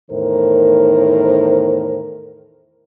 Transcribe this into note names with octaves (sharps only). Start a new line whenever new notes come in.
E2 A2 D#3 A#4 C5